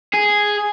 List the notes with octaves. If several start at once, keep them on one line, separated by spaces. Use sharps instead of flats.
G#4